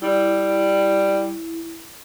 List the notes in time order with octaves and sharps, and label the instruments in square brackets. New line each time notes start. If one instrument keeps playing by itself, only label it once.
[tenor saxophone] G3 [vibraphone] E4